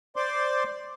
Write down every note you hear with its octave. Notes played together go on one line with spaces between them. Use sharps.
C5 D5 C6 D6